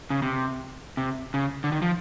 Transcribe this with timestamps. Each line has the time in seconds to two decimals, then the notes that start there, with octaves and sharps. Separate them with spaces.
0.10 C#3
0.22 C3
0.97 C3
1.34 C#3
1.64 D3
1.72 D#3
1.82 F3